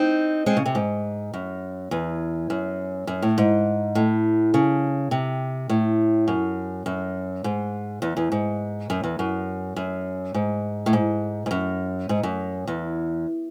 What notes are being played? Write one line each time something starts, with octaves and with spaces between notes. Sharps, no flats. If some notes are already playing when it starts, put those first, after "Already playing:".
Already playing: C4 D#4
G#3 C4
C#3
C3
G#2
F#2
E2
F#2
F#2
A2
G#2
A2
C#3
C3
A2
F#2
F#2
G#2
E2
E2
G#2
F#2
E2
F#2
F#2
G#2
A2
G#2
G#2
F#2
G#2
F#2
E2